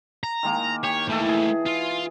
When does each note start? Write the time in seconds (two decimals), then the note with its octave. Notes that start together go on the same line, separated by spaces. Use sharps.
0.24 A#5
0.43 D#3 G#3 A#3
0.83 G4 C#5
1.09 E3 A3 A#3 A4
1.29 G#4
1.66 F4